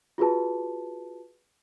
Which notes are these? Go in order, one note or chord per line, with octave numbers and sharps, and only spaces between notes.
F4 F#4 G#4 B4 A5